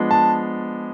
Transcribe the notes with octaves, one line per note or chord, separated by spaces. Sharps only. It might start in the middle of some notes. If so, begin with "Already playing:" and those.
Already playing: F3 G#3 B3 D4
A5